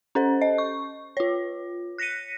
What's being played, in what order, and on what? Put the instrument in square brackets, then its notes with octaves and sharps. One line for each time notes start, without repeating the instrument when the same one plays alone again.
[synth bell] C#4 A4 C5
D#5
C#6
F4 C#5
F#6 A#6 B6 C#7 D#7